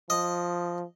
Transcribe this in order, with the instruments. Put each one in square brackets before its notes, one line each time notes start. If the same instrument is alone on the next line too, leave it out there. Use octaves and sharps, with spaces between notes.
[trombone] F3 [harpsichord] D#5